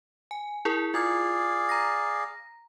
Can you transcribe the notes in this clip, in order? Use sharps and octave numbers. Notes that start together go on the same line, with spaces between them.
G#5
E4 G#4 A#4
F4 G#4 D5 F5 G#6
A#5 A#6